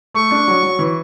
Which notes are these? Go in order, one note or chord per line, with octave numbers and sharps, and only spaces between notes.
A3 C#6
D4
F#3
F#3
E3